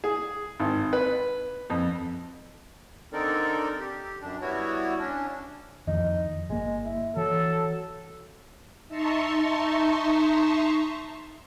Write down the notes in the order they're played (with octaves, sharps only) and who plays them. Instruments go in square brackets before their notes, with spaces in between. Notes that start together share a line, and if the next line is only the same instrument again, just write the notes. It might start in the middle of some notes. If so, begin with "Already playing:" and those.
[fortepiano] G#4
G#1
B4
F2
[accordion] D3 C4 D#4 A4 A#4 D5
G4
F#2 D4
G3 B3 E4 F#4 C#5
C#4 D4
[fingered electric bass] F2 D#3 F3 [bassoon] D#4
[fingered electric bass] G1 A#3 [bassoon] G#3
[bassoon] E4
[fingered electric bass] E3 [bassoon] F#3 [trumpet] A4
[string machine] D#4 E5 A5 A#5 C6 C#6